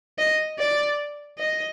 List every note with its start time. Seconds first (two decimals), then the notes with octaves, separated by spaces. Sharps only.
0.18 D#5
0.59 D5
1.39 D#5